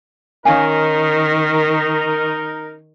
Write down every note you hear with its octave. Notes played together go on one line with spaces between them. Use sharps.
D#3 C#4 D#4 A#4 F5 G#5